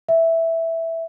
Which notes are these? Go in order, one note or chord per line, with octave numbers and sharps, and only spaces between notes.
E5